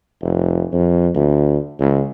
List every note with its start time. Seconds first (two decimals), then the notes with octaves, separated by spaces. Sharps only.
0.21 F1
0.73 F2
1.15 D2
1.80 C#2